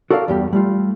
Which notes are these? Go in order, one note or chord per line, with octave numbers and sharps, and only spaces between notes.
F#4 A4 A#4 D5 F5
E2 G2 G4
G3 A3 F4